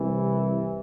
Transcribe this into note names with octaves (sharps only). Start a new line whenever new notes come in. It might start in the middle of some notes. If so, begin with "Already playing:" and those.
Already playing: C2 C3 E3